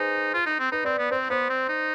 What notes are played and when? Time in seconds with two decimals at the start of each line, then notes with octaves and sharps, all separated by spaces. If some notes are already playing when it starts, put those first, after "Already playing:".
Already playing: D#4 G#4 B4 C5
0.34 F4
0.46 D#4
0.59 C4
0.72 D#4 B4
0.85 C4 D5
0.98 B3
1.11 C4 C5
1.30 B3 C5
1.49 C4
1.69 D#4